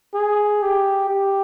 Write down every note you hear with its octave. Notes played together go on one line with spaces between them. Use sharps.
G#4
G4
G4